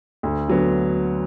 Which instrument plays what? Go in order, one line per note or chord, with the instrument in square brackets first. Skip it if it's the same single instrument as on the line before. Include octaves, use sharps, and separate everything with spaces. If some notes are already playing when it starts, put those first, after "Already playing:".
[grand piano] D2
D3 F#3 B3